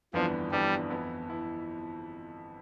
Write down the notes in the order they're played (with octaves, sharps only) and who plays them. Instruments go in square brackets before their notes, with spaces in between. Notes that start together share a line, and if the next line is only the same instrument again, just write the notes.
[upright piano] G1 F2 E3 B3 D4 [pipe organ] F3
[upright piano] G1 F2 E3 B3 D4 [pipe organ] G3
[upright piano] F2 E3 B3 E4
E3 B3 E4